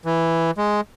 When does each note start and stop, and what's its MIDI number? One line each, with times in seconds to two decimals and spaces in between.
0.05 0.51 52
0.58 0.81 56